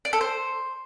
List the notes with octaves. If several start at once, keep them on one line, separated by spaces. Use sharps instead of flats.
D5
A4
C5